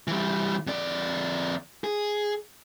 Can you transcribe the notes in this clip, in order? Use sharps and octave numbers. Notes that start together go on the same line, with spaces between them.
E3 G3
F2 D5
G#4